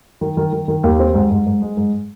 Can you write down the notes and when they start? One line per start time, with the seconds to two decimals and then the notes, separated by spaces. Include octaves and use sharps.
0.21 D#3
0.37 D#3
0.53 D#3
0.68 D#3
0.83 D#2
0.99 C4
1.14 G#2
1.31 G#2
1.46 G#2
1.62 G#3
1.77 G#2